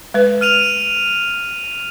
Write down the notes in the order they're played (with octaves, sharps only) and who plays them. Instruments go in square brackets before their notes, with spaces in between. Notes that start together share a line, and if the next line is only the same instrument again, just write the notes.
[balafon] G#3 B4
[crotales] F6 D#7 F7